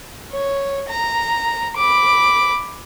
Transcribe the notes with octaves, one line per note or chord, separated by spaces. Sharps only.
C#5
A#5
B5 D6